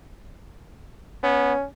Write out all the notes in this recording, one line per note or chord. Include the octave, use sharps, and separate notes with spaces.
B3 C#4